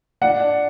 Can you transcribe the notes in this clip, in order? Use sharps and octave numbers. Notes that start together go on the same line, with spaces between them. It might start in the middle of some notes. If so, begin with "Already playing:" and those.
D4 F#5
D4